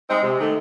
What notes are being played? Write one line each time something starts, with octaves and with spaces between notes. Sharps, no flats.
G#3 C4 D#4
C3
D#3 A3